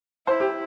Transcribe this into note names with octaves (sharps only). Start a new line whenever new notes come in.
E4 C5
G4